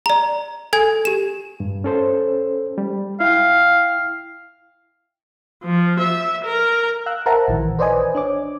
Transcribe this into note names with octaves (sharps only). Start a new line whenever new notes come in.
D5 A#5
A4 G#5 G#6
G4 E7
G2
C#4 A4 C5
G3
E4 F5 G5
F3
E5
A#4
F5 E6 F#6
A#4 C5 E5 F#5 A5 A#5
A#1 D#3 E3
B4 C5 D5 D#5 G#5
D4 C#5 D6